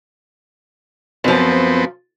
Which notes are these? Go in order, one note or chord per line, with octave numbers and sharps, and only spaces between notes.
F#2 F3 B3 C4